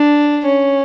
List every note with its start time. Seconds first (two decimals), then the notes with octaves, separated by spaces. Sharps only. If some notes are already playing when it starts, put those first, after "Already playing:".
Already playing: D4
0.46 C#4